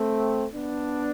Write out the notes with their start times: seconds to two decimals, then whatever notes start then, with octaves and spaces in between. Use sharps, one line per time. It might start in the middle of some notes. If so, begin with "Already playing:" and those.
Already playing: A3 C4
0.53 B3 D4